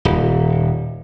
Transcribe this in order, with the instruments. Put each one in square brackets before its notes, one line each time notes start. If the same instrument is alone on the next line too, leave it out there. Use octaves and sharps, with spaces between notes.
[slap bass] D#1